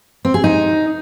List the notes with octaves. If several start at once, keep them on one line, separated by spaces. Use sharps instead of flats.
C4
G#4
D#4